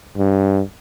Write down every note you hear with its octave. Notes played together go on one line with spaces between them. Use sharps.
G2